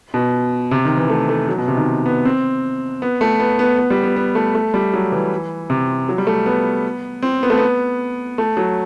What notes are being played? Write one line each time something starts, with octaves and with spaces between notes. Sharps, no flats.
B2
C3
D#3
E3
A3
A3
F#3
B2
C3
D#3
B3
C4
B3
A3
B3
B3
B3
G3
B3
B3
A3
A3
G3
F#3
E3
C3
F#3
G3
A3
B3
C4
B3
A3
B3
A3
F#3